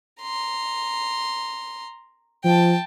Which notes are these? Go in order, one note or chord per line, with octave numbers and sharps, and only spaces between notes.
A#5 C6
F3 G5 A5